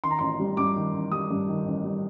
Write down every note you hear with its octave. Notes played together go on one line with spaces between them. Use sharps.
D#3 C6
A#5
A1 C6
G3
G2 D6
D#3
A1
G3 D#6
G2
D#3
A1
G3